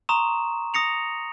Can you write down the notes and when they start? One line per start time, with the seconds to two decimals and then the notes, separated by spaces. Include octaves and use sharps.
0.09 A#5 C6 C#6 D#6 E7
0.74 D#6 A#6 C#7 F7